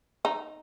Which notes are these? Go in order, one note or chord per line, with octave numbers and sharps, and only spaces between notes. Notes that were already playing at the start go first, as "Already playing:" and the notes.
D#4